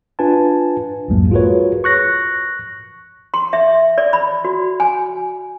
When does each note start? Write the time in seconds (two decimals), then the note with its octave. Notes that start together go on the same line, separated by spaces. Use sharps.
0.19 D4 F4 B4 G#5 A5
1.08 B1 F2 G#2 F#3 G#3 A#3
1.31 F4 F#4 G#4 A#4 B4 C#5
1.84 C#6 F#6 A#6
3.34 C6
3.53 E5
3.98 D5
4.13 B5
4.45 F#4
4.80 G#5